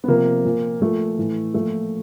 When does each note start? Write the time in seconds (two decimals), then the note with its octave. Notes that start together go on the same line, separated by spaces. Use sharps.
0.04 B3
0.08 C3 F3 A#3
0.45 A#2 F3
0.81 A#2 F3 A3
1.18 A2 E3
1.54 A#2 F3 A3